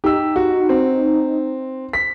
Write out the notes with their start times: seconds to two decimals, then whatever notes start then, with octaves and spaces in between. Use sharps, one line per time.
0.04 D#4 G4 E6
0.36 F#4
0.69 C4
1.93 B6